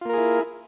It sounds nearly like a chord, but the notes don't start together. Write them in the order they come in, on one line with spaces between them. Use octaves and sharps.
F4 A#3 A#4 G#4 E4